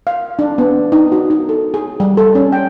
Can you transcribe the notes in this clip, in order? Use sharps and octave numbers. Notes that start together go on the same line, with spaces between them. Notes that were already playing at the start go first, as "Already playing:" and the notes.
F5
D4
B3
D#4
F#4
D#4
A4
G#4
G3
A4
C#4
G5